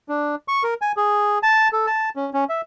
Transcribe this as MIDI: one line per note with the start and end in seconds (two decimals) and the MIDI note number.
0.09 0.35 62
0.48 0.63 85
0.63 0.74 70
0.82 0.92 80
0.97 1.39 68
1.43 1.68 81
1.73 1.86 69
1.87 2.09 81
2.16 2.30 61
2.33 2.44 61
2.49 2.61 76